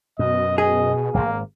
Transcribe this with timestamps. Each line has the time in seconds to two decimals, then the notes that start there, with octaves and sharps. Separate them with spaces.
0.19 F#2 B2 D#5
0.58 G#4 D#5
1.14 D#1 G#1 A#3